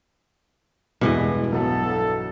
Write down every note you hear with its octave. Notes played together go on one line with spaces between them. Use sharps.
E2 G2 B2 E3 G3 G#3 D#5
B1 F#3 B3 A4